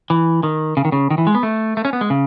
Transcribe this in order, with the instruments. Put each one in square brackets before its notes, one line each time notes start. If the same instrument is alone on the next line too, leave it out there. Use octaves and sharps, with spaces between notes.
[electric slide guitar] E3
D#3
C#3
D#3
C#3
D#3
E3
G#3
B3
A3
A3
C#4
B3
G#3
C#3